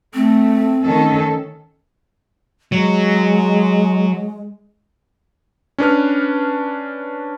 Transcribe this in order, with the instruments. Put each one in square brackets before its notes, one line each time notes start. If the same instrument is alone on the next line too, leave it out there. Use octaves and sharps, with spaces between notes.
[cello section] A3 [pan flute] C4
[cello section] D#3 C#4 A4
[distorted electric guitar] F#3 [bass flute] G#3
[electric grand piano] C#4 D4 B4 F6